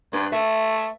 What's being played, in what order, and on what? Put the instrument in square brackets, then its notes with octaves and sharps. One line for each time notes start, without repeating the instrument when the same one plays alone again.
[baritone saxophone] G2 [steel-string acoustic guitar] D4 B4
[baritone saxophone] A3 [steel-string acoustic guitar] E5